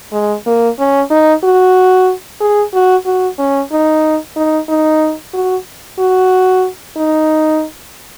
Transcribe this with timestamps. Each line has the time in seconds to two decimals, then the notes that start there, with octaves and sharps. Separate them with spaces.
0.12 G#3
0.46 A#3
0.79 C#4
1.10 D#4
1.43 F#4
2.40 G#4
2.73 F#4
3.05 F#4
3.39 C#4
3.72 D#4
4.36 D#4
4.69 D#4
5.34 F#4
5.98 F#4
6.96 D#4